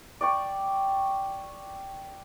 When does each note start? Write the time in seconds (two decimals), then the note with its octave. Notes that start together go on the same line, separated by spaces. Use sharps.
0.21 D5 G5 C#6